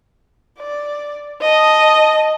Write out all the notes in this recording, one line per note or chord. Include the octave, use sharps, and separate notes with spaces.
D5
D#5 A5